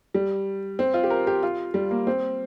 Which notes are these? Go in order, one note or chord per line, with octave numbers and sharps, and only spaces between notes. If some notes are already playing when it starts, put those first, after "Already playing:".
G3
C4
F4
G4
A#4
G4
F4
G3
A#3
C4